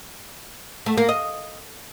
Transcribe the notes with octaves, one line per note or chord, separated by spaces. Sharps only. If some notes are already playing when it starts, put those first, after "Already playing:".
A3
A#3
D#5